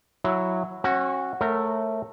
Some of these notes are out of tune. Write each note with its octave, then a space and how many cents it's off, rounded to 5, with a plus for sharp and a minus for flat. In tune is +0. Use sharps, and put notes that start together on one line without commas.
F#3 -10 E4 +0
C#4 -35 F#4 -5
A3 +0 A#4 -20 C#5 -20